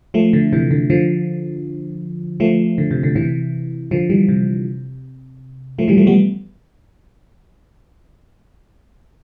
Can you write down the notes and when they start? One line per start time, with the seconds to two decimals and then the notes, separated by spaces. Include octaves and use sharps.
0.14 F3 A3
0.33 D3
0.53 C3 E3
0.71 D3
0.90 D3 F3
2.40 F3 A3
2.78 D3
2.91 C3
3.03 D3
3.15 C3 E3
3.91 D3 F3
4.10 E3 G3
4.28 C3
5.79 F3 A3
5.88 E3 G3
5.97 F3 A3
6.07 G3 B3